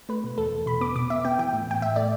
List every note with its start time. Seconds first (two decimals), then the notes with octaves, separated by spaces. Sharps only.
0.09 A3 B4
0.24 B2
0.38 E2 A4
0.53 E2
0.66 B2 B5
0.81 B3 D6
0.96 B2 D6
1.10 B3 E5
1.25 B3 G5
1.39 E3 G5
1.53 A2
1.67 A2 G5
1.81 A2 E5
1.96 A3 D5